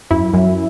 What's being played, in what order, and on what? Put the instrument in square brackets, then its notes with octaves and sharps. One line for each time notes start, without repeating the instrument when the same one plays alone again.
[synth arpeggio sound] F#2 E4
F#2